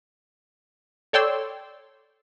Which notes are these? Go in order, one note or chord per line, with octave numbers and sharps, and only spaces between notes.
A4 C#5 D5 G5 C6 E6